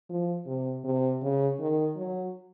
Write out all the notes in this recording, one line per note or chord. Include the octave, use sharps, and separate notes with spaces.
F3
C3
C3
C#3
D#3
F#3